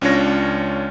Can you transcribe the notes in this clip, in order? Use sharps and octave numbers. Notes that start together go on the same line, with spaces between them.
C#2 C#4 D4 F4 C#5 A#6